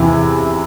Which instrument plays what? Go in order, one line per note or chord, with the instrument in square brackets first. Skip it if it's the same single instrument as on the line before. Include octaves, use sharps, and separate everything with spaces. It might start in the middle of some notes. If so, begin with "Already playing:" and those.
Already playing: [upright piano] E2 C3 E3